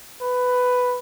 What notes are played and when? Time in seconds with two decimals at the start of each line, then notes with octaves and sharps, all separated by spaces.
0.21 B4